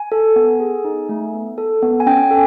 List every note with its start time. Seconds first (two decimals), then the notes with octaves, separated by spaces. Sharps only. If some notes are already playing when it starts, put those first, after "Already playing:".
Already playing: G#5
0.12 A4
0.36 B3
0.60 G#4
0.84 D#4
1.09 A3
1.34 B3
1.58 A4
1.82 B3
2.00 G#5
2.07 C#4 G5
2.31 A4